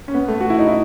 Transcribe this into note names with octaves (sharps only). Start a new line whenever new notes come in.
C#4
B3
A3
F#4
E4
D#4
E4